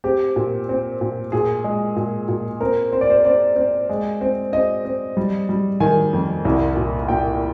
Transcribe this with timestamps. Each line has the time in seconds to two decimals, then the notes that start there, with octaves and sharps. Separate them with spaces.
0.04 C4 G4
0.36 A#2
0.69 C4
1.01 A#2
1.32 A#2 G#4
1.64 G#3
1.96 A#2
2.28 A#2
2.61 C4 A#4
2.93 C4 C5
3.01 D5
3.10 C5
3.25 C4 D5
3.56 C4
3.89 G#3
4.21 C4
4.53 C4 D#5
4.85 C4
5.17 G3
5.49 G3
5.80 D#3 G#5
6.13 F2
6.45 C2
6.77 A#2
7.08 A#2 G5